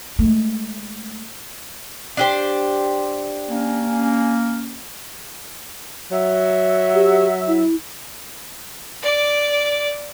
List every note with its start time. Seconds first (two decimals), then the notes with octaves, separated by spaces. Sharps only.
0.19 G#3 A3
2.17 D4 G4 C5
3.50 A#3 C#4
6.11 F#3 E5
6.94 G4
7.48 E4
9.02 D5 D6